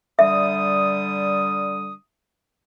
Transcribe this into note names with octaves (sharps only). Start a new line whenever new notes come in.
D3 G3 E5 D#6